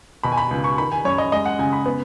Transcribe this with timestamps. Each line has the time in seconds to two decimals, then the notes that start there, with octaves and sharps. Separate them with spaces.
0.23 B2 B5
0.32 G#5
0.37 B5
0.51 C#2
0.64 C#6
0.78 D#3 B5
0.92 G#5
1.05 F#2 C#5
1.18 D#5
1.32 G#3 D#5
1.46 F#5
1.59 C#3 G#5
1.73 B5
1.86 B3